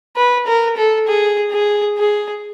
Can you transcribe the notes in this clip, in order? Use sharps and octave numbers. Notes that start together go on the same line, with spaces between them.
B4
A#4
A4
G#4
G#4
G#4